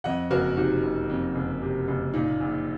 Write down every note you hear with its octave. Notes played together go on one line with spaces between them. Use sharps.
F2 D#5 F#5
F#1 F#4 A#4
C3 D#4 F#4
F#1
F2
F#1
C3
F#1
A#2 D#4
A#1